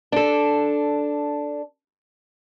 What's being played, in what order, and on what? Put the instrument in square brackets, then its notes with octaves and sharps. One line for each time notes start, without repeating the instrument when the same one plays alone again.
[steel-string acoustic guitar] D4 A4